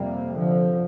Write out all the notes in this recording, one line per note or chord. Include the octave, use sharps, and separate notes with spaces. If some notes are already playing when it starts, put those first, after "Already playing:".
Already playing: F2 C3 G3 A#3
D3 F3